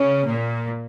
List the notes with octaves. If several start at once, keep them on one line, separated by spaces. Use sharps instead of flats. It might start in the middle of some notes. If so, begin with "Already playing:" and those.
Already playing: C#3 C#4
A#2 A#3